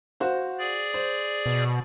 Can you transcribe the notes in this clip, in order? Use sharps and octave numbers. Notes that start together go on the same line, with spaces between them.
F#4 C5 F5
G#4 D5
C5
B2